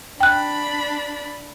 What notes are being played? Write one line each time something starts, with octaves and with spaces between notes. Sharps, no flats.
D4 G5 B5 F#6